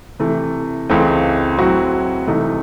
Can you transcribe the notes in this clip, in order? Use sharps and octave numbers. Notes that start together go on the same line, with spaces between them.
C3 E3 A3
C#2 C#3 E3 A3 C4
A2 F#3 C4 F#4
C2 C3 E3 A3 D#4